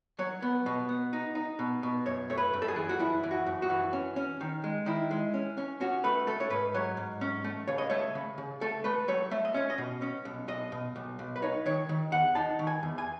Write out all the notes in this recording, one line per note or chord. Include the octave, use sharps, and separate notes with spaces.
F#3 C#5
B3
B2
B3
D#4
D#4
B2
B2
F#2 C#5
A3 C#5
B4
F#2
A4
G#4
E3
F#4
F#2 E4
E3
F#4
F#2
F#4
E3
C#4
C#4
D#3
G#3
D#3 E4
G#3
C#4
C#4
C#4 F#4
A3 B4
A3 A4
C#5
G#2 B4
F#3 C#5
G#2
C#4
A3
C#3 C#5
D#5
A3 C#5
C#3
C#3
A3 A4
A3 B4
F#3 C#5
A3 E5
D#5
C#4 C#5
D#5
B2
C#4
B1
B1 D#5
B2
B1
B1
B4
D#4 C#5
D#3 C#5
D#3
E2 F#5
D#4 A5
D#3
G#5
E2
G#5